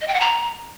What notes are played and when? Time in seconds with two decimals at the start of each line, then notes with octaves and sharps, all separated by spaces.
0.01 D#5
0.08 G5
0.14 F#5
0.21 A#5